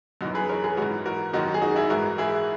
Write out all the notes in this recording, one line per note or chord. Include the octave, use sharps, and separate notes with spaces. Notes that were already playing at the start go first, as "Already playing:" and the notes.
F#2 E3 D#4 F#4
G#4 B4
A#4 C#5
G#4 B4
G#2 E3 F#4 A#4
F#4 A#4
F#2 D#3 D#4 F#4
G#4
D#4 F#4
E4 G#4
G#2 E3 F#4 A#4
E4 G#4